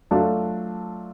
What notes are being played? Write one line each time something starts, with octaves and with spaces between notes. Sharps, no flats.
F#3 A3 D4 F4 A4